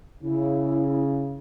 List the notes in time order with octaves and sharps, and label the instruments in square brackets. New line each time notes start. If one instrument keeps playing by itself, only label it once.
[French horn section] C#3 [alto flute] E4